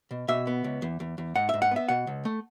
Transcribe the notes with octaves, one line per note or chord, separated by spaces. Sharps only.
B2
B2 E5
B3
C#2
E2
E2
E2
G#2 F#5
G#2 E5
F#5
B3 E5
B2 F#5
C#2
A3